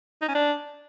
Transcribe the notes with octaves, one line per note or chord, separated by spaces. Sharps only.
D#4
C#4
D4